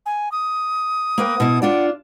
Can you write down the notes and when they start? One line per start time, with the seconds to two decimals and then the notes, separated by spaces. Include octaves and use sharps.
0.06 G#5
0.32 D#6
1.18 A#3 B4 G5
1.40 B2 E4
1.62 D4 F4 D5 F#5